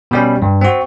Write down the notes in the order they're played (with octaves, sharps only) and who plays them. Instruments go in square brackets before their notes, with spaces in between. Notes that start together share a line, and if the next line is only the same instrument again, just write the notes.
[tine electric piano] B2 G3 C#4
G2
C4 F#4